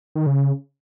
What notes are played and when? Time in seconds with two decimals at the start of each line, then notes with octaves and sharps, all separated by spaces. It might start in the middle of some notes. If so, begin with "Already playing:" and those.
0.15 D#3
0.26 C#3